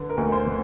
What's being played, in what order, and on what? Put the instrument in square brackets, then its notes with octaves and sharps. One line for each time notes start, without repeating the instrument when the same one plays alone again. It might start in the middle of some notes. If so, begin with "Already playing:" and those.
Already playing: [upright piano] D3 B4
A#4
D2
C5
D3